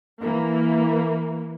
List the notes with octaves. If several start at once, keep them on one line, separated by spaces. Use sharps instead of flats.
E3 A#3